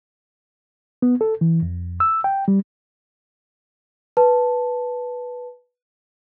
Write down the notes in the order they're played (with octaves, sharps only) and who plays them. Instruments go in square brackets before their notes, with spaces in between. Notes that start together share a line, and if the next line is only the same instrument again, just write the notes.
[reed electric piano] B3
A4
E3
F2
E6
G5
G3
[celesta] B4 A5